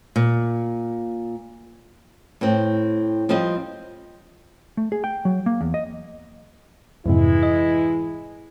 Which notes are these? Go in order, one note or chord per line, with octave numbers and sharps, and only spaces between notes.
A#2
A2 C4
F3 G3 C4 C5 D#5
A3
G#4
G5
F#3
A#3
E2
D#5
F2 G#2 C3 E3 G#3 E4
D#5